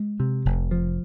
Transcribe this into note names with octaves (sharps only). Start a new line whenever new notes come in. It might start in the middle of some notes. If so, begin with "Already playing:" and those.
Already playing: G#3
C3
F1
F3